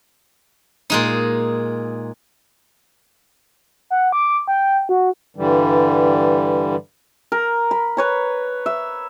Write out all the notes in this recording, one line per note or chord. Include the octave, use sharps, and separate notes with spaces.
A#2 G#3 D#4
F#5
D6
G5
F#4
G2 D3 E3 G3
A#4
B5
B4 C#5 A#5
E5